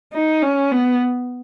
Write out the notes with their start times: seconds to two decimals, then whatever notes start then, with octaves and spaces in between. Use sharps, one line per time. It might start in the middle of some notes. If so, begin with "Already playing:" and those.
0.13 D#4
0.43 C#4
0.71 B3